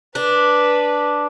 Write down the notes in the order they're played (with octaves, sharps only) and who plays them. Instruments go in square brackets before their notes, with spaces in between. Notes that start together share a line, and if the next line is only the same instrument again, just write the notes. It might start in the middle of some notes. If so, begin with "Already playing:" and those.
[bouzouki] D4 [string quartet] B4